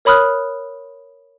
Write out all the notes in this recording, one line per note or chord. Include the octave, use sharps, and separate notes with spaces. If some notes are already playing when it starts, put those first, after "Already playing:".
A#4 C#5 B5 D#6 F6 F#6